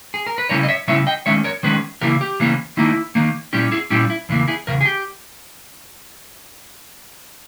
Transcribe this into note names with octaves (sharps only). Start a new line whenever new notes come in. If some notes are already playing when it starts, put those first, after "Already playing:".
G#4
A#4
B4
C#3 G3 C#4 E4 A#4 C#5
D#5
C#5 E5
C#3 G3 C#4 E4 C#5 E5
D#5 G5
D#3 G#3 C#4 C#5 E5
A#4 C#5
D#3 G#3 C#4 G#4 B4
C#3 E3 A#3 E4 G4 A#4
G4
C#3 E3 A#3 C#4 E4
D#3 A#3 D#4 E4
D#3 A#3 D#4
A#2 G3 C#4 E4 G4
E4 G#4
A#2 G3 C#4 E4 G4
E4
E2 C#3 E3 A#3
E4 G#4
E2 C#3 A#4
G#4
G4